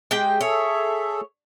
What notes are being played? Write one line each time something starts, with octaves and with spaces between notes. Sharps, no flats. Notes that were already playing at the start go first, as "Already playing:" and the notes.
G#3 G4 G5
G#4 A4 C#5 E5